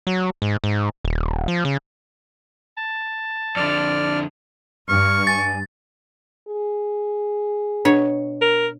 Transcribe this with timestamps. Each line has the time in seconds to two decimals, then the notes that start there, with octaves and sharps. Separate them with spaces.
0.07 F#3
0.42 G#2
0.64 G#2
1.05 D#1
1.48 F3
1.65 C#3
2.77 A5
3.56 F2 D3 D5 F6
4.89 G2 C#6 F6
5.27 G#5 A6
6.48 G#4
7.85 B2 D4 C#5
8.42 A#4